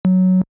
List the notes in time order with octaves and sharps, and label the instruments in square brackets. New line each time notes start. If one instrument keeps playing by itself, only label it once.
[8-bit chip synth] F#3